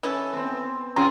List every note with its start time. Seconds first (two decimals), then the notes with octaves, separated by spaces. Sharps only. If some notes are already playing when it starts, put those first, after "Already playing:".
0.03 E3 C#4 A4
0.33 B3 C4
0.96 C4 C#4 F4 G#4 A#5 C6